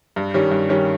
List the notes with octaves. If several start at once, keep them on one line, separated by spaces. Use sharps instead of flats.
G2
D#3 G3 C#4
G2
D#3 G3 C#4